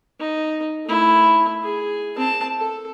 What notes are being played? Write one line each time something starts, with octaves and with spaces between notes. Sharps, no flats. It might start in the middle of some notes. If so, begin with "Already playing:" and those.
D#4
A3 E4
G#4
C4 A5
A4